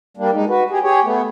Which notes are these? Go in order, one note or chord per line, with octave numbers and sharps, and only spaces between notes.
G3 A#3 D4
G#3 D#4
F#4 B4
G4 G#4
G4 G#4 C#5
A3 B3